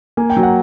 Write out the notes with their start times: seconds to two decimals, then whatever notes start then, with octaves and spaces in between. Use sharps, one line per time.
0.17 A#3 G#5
0.30 G5
0.37 F#3
0.43 F#5